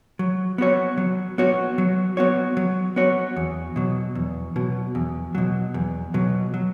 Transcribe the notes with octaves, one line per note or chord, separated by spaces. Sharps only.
F#3
B3 F#4 C#5
F#3
B3 F#4 C#5
F#3
B3 F#4 C#5
F#3
B3 F#4 C#5
E2
B2 F#3
E2
B2 F#3
E2
B2 F#3
E2
B2 F#3
F#3